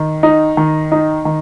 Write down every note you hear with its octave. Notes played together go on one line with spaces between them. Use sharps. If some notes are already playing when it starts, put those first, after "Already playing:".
Already playing: D#3
D#4
D#3
D#4
D#3